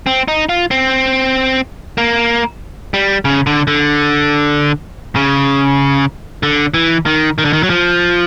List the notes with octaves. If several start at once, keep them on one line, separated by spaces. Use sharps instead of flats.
C4
D#4
F4
C4
A#3
G3
C#3
D3
D3
C#3
D3
E3
D#3
D#3
D3
D#3
F#3
F3